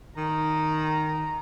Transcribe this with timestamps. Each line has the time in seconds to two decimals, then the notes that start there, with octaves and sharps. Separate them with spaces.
0.17 D#3 A#5